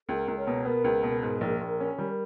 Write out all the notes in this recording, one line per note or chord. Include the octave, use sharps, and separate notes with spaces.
C#2 A#4
C#2
A#4 C#5
B2
B3 A#4
C#2
B2
G#2
A#1
A#1
C#4
G3